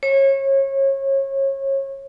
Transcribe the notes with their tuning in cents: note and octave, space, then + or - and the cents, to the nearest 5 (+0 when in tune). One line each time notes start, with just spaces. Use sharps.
C#5 -30